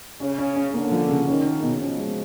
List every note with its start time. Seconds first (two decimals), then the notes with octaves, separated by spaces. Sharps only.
0.20 C#3 C#4
0.38 C#4
0.56 C#4
0.74 D3 A#3
0.91 F3
1.09 C#3
1.27 D#3 C#4
1.44 C#4
1.63 B2
1.80 F3 C#4
1.98 G#3